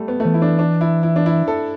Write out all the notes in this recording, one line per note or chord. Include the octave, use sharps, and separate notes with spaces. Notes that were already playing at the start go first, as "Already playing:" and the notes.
Already playing: G3 A3
B3
A3
E3 B3
E4
D4
D4
E4
E4
D4
E4
A4